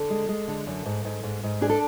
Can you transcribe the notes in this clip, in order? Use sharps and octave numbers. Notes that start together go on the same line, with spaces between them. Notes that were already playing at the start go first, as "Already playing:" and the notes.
Already playing: D3 A4
G#3
G#3
D3
F#2
G#2
G#2
G#2
G#2
D4 G#4
A4